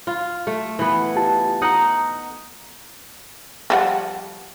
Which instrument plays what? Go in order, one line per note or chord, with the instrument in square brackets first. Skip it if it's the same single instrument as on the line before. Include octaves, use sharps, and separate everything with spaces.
[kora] F4
A3
E3 B3
[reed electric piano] F4 G4 A5
[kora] D#4 F#5 [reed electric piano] A#5 D#6
[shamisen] F3 G3 F#5